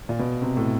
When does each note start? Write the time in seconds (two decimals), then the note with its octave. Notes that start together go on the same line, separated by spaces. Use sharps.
0.09 A#2
0.19 B2
0.42 C3
0.57 A2